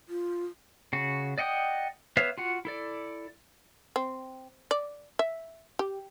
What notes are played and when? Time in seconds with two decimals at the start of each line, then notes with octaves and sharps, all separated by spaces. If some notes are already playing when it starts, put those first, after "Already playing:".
0.09 F4
0.93 C#3 F#4
1.38 D5 D#5 F#5 G5 D#6
2.17 B3 B4 C#5 E5 F5
2.38 F4 F#4 F#5
2.65 E4 A4 D5
3.96 C4
4.71 D5
5.19 E5
5.79 G4